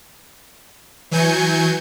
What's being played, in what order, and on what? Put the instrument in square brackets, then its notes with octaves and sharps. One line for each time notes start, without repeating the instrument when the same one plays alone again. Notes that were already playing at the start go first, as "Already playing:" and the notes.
[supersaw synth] E3 F#3 G#5 G6 G#6 C#7